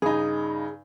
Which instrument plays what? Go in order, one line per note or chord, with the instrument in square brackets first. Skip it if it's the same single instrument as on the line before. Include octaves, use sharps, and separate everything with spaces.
[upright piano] G2 C#3 D#4 [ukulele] G#4